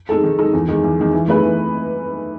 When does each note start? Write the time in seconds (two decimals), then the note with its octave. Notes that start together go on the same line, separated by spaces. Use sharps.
0.09 G#3 D#4 A4
0.24 D#3
0.39 G#3 D#4 A4
0.53 E2
0.68 D#3 G#3
0.84 E2
0.98 D#3 G#3
1.13 E3
1.28 A3 D#4 G#4 B4
1.43 E3